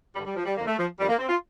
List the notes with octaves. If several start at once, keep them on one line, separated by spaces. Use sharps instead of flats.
G2 G3
D3
G3
F3
G3
F2 D3 A#3
A3
F3
F2 D#3 G3
A#3
C4
F4